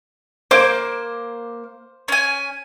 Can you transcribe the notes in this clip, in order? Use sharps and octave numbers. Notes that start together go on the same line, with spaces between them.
A#3 C5 D6
C#4 G#5